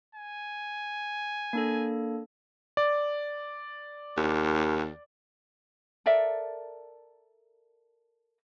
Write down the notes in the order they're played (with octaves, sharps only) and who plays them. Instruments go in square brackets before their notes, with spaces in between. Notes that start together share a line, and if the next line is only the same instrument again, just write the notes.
[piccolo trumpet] G#5
[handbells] A#3 D4 A4
[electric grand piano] D5
[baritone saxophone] D#2
[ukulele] A4 A#4 D5 E5